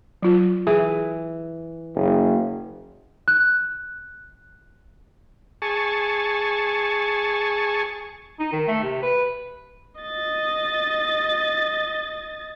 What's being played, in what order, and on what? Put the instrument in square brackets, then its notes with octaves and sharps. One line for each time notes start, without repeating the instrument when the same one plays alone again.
[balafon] F#3 F4
[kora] E3 [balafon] G#4
[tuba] F#1
[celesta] F#6
[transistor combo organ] G#4 A5 C#6
[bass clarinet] D#4
D#3
A3
C3
B4
[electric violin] D#5 A6